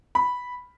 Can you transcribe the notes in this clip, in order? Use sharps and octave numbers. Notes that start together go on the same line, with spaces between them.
B5